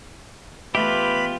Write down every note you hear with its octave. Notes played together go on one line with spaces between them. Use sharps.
E2 A3 F4 G4 B4 E5 B5